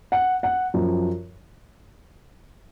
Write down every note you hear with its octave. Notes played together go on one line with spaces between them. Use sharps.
F#5
F#5
F#2 F3